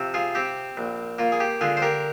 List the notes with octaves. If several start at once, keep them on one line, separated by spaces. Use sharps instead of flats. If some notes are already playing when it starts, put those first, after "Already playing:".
Already playing: C3 F3
F4 G#4
C4 G4
A#1
A#3 F4
G#4
G4
D3 F4 G#4
C5
G4 A#4